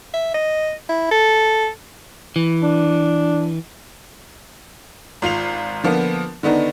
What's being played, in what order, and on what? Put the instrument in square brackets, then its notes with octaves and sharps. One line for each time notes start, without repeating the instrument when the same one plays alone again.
[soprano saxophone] E5
D#5
E4
A4
[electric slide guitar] E3
[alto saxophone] D4
[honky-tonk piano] G#1 F4 C7 F7
D3 F3 A#3 B3
D3 D#3 B3 D4 D#4